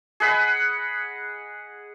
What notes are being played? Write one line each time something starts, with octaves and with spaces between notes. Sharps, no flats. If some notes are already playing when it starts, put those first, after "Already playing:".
G#4 D#5 F#5 B5